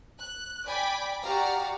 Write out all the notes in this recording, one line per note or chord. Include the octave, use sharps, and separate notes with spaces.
F#6
D5 G5 G#5 B5 D6
F#4 G4 D5 F5 A#5